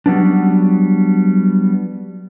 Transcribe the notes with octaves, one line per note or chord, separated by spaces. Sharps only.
F#3 G3 B3 D4